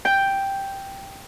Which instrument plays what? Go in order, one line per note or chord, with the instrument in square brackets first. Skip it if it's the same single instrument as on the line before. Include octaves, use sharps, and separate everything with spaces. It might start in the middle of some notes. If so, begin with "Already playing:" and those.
[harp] G5